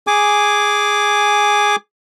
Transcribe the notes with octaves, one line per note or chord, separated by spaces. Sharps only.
G#4 G#5 D6